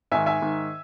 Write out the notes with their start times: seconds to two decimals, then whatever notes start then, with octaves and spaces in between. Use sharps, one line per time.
0.11 G#2 D#3 E5 G#5
0.26 E5 G#5
0.42 G#2 D#3